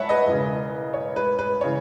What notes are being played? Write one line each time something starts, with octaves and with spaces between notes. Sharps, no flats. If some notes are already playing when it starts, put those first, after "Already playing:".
Already playing: C#5 E5 F#5 A5 B5
B4 D#5
E1 E2 C#3
C#5
B4
B4
C#3 E3 C#5